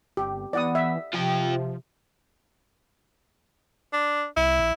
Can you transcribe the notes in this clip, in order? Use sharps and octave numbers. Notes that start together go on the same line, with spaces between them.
G1 G4
E3 B3 D5 F#5 D#6
E5
C3 F3 F4 G5
D4
C2 E4
A#1